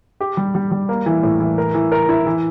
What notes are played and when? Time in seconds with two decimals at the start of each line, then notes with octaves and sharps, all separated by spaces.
0.20 G4
0.37 G3
0.55 G3
0.71 G3
0.89 A#3
1.06 E3
1.23 A2
1.40 E3
1.58 A#4
1.74 E3
1.92 A#4
2.09 E4
2.26 E3